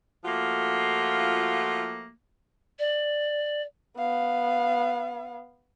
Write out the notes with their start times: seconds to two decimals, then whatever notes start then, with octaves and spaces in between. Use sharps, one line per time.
0.25 F3 A3 A#3 F4 F#4
2.79 D5
3.97 B3 F5